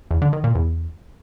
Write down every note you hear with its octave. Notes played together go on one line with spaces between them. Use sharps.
E2
D3
D#3
A#2
E2